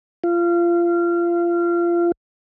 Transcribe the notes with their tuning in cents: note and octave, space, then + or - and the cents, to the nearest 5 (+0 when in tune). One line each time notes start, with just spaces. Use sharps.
F4 -25